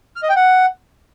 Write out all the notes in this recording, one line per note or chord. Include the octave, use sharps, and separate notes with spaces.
F6
D#5
G5
F#5